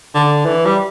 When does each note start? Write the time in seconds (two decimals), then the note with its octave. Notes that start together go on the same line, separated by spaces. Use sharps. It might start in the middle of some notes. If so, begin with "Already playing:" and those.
0.15 D3
0.45 E3
0.65 G3